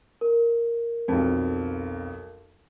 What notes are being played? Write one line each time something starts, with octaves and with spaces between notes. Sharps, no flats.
A#4
B1 F2